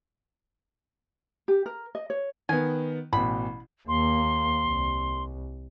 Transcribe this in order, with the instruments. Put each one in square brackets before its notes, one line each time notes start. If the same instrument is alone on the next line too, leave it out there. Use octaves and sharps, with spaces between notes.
[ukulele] G4
A#4
D#5
C#5
[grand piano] D#3 B3 [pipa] G#5
[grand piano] A1 B2 [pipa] B5
[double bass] D#2 A#3 [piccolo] C6
[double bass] C2